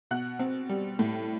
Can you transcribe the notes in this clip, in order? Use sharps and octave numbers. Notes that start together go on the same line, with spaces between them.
B2 F#5 F#6
C4
G3
A2